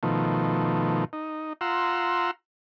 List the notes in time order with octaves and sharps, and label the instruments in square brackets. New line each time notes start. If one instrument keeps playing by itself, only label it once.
[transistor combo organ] B2 D#3 F3 A3
D#4
F4 F#5 A#5 C6 E6